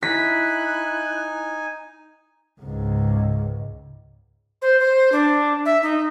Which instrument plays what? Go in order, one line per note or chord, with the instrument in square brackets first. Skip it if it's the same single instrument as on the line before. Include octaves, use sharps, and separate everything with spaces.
[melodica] D#4 G#5 [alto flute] E4 [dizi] F#6 [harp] B6
[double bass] C#2 G#2
[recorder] C5
C5
D4
E5
D#4